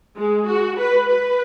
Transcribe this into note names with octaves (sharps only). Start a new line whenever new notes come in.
G#3
F#4
B4
B4